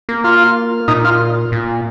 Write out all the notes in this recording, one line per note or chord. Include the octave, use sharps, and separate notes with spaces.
A#3
F4
A#2 D#4
F4
A#2